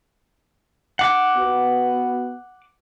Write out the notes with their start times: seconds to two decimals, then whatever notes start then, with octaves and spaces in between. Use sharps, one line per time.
0.99 F#5 D6
1.36 B3 F#4